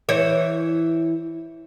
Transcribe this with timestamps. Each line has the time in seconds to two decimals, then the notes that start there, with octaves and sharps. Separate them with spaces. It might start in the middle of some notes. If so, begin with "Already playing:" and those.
0.09 E3 C5 C#5